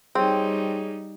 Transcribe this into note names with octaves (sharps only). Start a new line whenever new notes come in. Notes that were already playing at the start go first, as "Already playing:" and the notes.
G3 C4 D#4 G#4 C#5